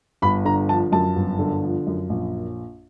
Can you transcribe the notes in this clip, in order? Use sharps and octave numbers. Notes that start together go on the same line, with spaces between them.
G1 B5
D3 A#5
F3 A5
F#2 A5
G1
D3
F3
F#2
A#1